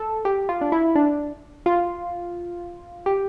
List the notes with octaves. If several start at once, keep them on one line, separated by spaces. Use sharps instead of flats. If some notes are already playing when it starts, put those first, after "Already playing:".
Already playing: A4
G4
F4
D4
E4
D4
F4
G4